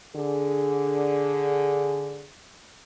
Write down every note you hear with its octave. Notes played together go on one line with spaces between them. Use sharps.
D3 G#4